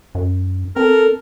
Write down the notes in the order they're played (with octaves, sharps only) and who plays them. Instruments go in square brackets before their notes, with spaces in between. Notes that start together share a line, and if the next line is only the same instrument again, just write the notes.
[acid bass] F#2
[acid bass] C4 [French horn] A4 [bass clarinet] A#4